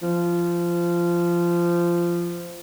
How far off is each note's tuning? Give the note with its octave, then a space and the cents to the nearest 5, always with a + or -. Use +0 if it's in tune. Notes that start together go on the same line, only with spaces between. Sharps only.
F3 -15